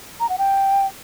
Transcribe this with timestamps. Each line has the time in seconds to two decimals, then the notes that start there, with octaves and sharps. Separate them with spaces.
0.20 A#5
0.29 F#5
0.38 G5